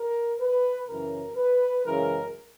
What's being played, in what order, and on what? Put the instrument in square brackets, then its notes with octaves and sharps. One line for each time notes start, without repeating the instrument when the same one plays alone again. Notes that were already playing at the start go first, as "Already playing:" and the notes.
Already playing: [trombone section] A#4
B4
F#2 C#3 E3 A#4
B4
F#2 C#3 E3 G#3 A#4